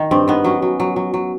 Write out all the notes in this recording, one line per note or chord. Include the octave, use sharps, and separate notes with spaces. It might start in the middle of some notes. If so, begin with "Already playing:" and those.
Already playing: D#3
G2 C4
D#3 B3
F#3 C#4
F#3
F#3
F#3
F#3